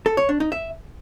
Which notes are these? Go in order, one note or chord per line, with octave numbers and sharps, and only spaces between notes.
A4
C#5
D4
D#4
E5